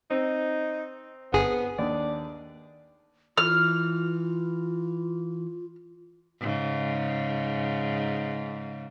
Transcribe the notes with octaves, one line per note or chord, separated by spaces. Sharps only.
C4 D#4
G1 B3 G#4
D#2 D4 D5
E3 F4 F6
G#2 C#3